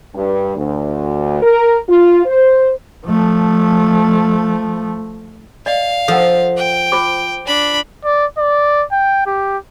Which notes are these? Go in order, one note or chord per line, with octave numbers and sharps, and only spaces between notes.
G2
D2
A#4
F4
C5
F3 A3
D5 D#5 F5
F3 A4 A#4 F#5
G5
F4 C5 D6
D4 B5
D5
D5
G5
G4